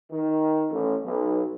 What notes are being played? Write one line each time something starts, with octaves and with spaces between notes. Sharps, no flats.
D#3
A1
B1